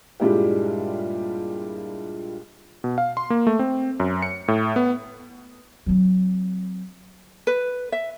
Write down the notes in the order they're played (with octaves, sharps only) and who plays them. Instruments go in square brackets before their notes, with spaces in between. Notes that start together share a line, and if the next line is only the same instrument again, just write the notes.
[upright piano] G2 A#2 G3 G#3 E4 G4
[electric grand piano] B2
F5
C6
A#3
A3
C4
F#2
C#7
A2
B3
[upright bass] F#3 C4
[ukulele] B4
E5